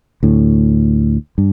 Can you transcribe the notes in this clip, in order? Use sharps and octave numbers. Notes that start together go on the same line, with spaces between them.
D2 A2
G2